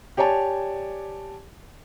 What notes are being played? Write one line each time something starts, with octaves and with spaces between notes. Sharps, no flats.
G4 C#5 D5 G#5 A5